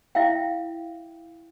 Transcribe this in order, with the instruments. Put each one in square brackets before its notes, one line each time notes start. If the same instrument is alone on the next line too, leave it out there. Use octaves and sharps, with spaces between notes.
[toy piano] E4 E5 F5 G5